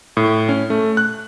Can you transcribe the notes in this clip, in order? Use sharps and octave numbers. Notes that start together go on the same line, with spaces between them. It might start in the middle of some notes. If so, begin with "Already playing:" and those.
A2
C#4
A3
F#6